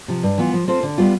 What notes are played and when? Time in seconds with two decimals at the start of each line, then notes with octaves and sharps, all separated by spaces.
0.08 C3 F3
0.23 G2
0.38 E3 B3 F4
0.53 F3
0.68 C4 F4 A4 C5
0.83 D3
0.98 G3 B3 F4